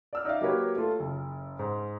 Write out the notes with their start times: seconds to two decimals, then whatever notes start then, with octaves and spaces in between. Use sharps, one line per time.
0.13 D5 E6 F6
0.25 D#4 D5 E5 F5
0.41 F#3 A#3 G4 A#4 B4 C#5
0.76 A3 F4 A4
1.00 F#1
1.59 G#2